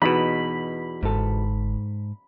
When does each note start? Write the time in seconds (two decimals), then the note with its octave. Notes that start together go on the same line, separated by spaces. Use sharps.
0.02 E2 B2 D#4 B5
1.03 G1 G#2 A4